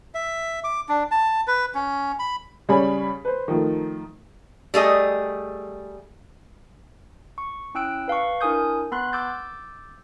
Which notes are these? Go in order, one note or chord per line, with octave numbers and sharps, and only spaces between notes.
E5
D6
D4
A5
B4
C#4
B5
C#3 G3 G#4 C#5 B5
B4 C5
D#3 F3 A3
G3 A3 G#4 D#5
C#6
C#4 E4 G5 E6 F#6 D7
B4 F5 A5 C#6
D4 E4 A#4 G#5 D#6 G6
B3 B5 C6 F#6
D6 E6 G6 A6